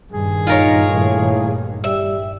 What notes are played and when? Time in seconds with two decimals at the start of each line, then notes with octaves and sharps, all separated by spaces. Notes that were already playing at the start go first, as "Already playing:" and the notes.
0.12 G2 A#2 D#3 G#4
0.47 D#4 F4 A#4 C#5
0.93 A2
1.84 G3 E5